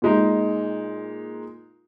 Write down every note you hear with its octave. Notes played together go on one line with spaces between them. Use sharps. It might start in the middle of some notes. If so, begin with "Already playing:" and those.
A#2 G#3 D#4